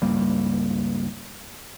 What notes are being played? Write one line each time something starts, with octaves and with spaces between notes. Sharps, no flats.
C#2 G2 G3 A#3